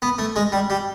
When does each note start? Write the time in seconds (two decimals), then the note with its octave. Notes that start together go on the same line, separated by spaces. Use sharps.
0.02 B3
0.18 A3
0.36 G#3
0.52 G3
0.70 G3